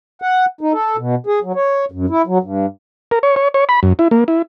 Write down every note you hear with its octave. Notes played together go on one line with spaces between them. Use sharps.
F#5
D#4
A4
B2
G#4
F#3
C#5
F#2
E4
F#3
G2
A#4
C#5
C#5
C#5
B5
F#2
E4
A#3
E4